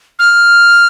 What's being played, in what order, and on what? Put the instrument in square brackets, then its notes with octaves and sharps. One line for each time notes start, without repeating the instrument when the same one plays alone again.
[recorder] F6